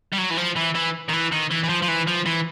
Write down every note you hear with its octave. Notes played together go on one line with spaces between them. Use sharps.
G3
F#3
E3
F3
E3
E3
D#3
E3
D#3
E3
E3
F3
F3
E3
F3
E3